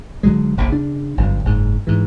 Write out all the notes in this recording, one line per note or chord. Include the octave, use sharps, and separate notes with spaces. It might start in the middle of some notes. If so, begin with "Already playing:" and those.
D3 F#3 G#3
F1 A#1 A#2
C#3 D4
G1 F#2 D3
F#1 G#2
G#2 E3